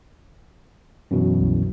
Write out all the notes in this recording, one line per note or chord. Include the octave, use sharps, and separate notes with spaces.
F#2 B2 E3
C2